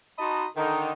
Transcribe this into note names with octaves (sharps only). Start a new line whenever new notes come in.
D#4 F#4 D#5 A5 B5 C6
D3 D#3 D#4